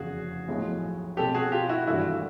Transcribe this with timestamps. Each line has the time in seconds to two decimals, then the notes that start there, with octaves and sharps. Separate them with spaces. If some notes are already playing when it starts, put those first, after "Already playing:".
Already playing: F1 E2 C#3 F#4 G#4
0.48 B1 A2 F3 G#3
1.17 B2 G#3 C4 G4 A4
1.34 F#4 G#4
1.52 F4 G4
1.69 E4 F#4
1.87 G#1 G2 E3 A3 E4 F#4